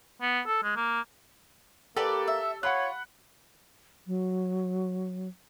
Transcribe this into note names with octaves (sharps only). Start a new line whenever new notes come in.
B3
A4
G#3
A#3
A#3 G4 A4 B4 D5
E5
F4 C#5 F#5 B5 F#6
F#3